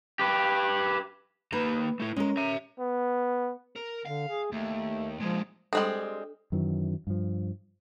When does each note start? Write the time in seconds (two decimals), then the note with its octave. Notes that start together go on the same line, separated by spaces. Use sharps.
0.19 G4 B4
1.53 A#3 D#4 B4 A#5
2.00 A3 E4
2.17 G#3 C#4 A#4
2.37 E5 A#5
2.79 B3
3.76 A#4
4.06 D3 F5
4.28 G#4
4.52 D#2 A3
5.20 A#2 F3 G#3
5.73 G3 G#3 C4 D4 A4
6.52 F#2 D#3 E3 F#3
7.07 G2 F3